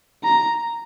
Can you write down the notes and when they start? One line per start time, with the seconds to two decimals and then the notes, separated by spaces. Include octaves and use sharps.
0.24 A#5